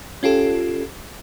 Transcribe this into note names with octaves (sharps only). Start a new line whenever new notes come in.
C#4 F4 G4 A4